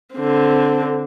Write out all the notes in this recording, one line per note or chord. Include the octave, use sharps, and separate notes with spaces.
D3 C4